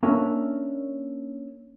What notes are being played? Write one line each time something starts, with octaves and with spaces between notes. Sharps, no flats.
A#3 C#4 D4 A#4 E5